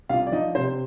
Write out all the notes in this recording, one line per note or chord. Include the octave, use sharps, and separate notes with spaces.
C2 F4 F5
D5
F3 D#4 D#5
C3 C5